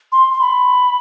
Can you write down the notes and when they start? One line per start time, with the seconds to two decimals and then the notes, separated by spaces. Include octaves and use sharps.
0.12 C6
0.34 C6
0.41 B5